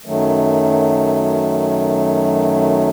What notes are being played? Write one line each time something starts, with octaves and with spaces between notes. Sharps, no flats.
F#2 D#3 F#3 A3